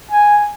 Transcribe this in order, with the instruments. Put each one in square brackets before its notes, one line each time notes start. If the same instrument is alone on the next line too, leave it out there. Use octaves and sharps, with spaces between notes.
[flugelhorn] G#5